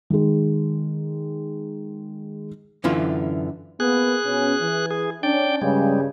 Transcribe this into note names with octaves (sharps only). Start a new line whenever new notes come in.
D#3 G#3
F#2 D3 E3 F4
A#3 B3 G#4 F#6
B2 B3 C#4
E3
G#4
C#4 D4 D5 G5
G2 C#3 G3 G#3